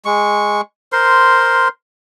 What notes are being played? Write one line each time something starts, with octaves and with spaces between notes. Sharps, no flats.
G#3 C#6
A#4 C5 C6